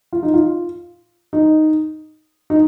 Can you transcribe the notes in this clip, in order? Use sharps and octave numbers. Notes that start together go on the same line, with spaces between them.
F4
D#4
F4
D#4
D#4